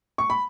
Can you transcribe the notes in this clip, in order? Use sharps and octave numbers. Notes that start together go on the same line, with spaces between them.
C#6
B5